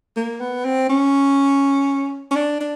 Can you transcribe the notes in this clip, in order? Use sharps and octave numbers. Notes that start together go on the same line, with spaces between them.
A#3
B3
C4
C#4
C#4
D4
D4